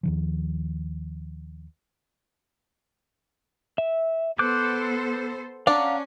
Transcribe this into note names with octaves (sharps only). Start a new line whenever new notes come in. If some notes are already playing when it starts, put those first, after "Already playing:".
D#2 D#3 F3
E5
B3 A4 C5 D6 F#6 G6
C#4 D4 D5 F5 F#5 A#5